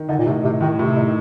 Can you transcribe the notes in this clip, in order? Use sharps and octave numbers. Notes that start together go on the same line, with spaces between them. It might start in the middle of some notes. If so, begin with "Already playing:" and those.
Already playing: D#3
D3 D#4
A#2
A2 C3
C3 D#4
A2 D#3
A2 C3
D#4